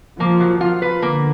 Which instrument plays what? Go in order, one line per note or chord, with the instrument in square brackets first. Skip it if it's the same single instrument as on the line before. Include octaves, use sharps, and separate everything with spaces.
[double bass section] F3 [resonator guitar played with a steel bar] A#3
[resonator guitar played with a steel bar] F#3
F4
B4
[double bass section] D3 [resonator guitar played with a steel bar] A#3